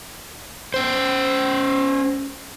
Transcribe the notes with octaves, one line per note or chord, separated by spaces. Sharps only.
C#4 C5